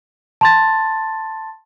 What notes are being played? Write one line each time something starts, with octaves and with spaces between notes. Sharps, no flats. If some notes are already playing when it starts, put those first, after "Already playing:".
A5 C6 A6